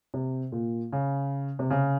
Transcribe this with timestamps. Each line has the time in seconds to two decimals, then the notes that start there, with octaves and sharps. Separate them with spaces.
0.14 C3
0.52 A#2
0.93 C#3
1.59 C3
1.70 C#3